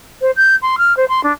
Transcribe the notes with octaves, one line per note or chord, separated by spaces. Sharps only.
C5
G6
C6
F6
C5
C6
D4